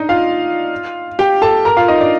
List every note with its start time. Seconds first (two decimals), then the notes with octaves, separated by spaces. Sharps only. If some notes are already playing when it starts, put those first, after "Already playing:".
Already playing: D4 D#4 D5 D#5
0.09 F4 F5
1.19 G4 G5
1.42 A4 A5
1.65 A#4 A#5
1.77 F4 F5
1.88 D#4 D#5
2.00 D4 D5